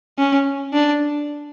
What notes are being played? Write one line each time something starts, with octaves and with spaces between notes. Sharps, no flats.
C#4
D4